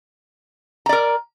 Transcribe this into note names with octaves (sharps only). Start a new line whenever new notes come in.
A#4 D5 A#5